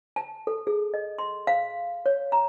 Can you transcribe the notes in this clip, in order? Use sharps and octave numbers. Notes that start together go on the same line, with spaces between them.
A5
A4
G#4
D#5
C6
F5
C#5
A#5